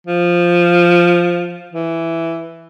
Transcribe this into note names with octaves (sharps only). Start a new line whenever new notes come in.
F3
E3